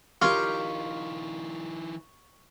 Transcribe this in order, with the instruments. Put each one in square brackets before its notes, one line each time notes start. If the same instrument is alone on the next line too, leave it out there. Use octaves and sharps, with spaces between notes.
[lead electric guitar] E3 D#4 [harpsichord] F4 [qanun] G4 A#4 C#5 [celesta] C#6